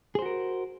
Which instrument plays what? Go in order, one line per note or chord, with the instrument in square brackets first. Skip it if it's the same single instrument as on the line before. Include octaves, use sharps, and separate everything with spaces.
[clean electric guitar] G#4
C5
F#4
A#4